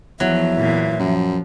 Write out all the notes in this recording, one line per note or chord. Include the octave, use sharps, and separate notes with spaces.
E2 F3 F#3 E5
A#2 E3
F#2 F3